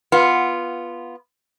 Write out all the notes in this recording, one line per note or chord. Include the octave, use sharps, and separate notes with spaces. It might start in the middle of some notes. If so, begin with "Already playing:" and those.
B3 F4